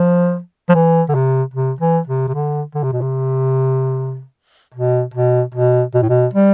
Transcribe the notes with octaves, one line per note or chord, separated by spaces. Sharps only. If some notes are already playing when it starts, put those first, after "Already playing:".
Already playing: F3
F3
E3
D3
C3
C3
E3
C3
C3
D3
D3
C3
B2
C3
B2
B2
B2
B2
A2
B2
G3